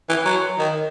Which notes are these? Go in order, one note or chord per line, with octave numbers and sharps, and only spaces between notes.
E3
F#3
D#3